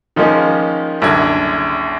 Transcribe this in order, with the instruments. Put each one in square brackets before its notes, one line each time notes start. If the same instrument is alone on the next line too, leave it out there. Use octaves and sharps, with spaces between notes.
[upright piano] D#3 F3 G#3 A#3 C#4 D#4
F#1 C2 F#2 D3 G#6